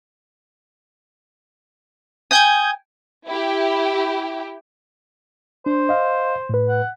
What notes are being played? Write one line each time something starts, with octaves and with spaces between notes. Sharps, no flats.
G5 G#5 D#6 G6 G#6
E4 G4
D4 C5
D#5 F5
A2 B4
F#5